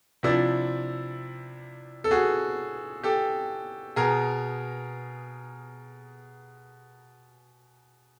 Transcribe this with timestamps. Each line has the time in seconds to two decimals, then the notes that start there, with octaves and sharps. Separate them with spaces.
0.23 C3 F3 D4 E4
2.04 A4
2.11 F#4 G#4
3.04 G4 A4
3.96 B2 G#4 A#4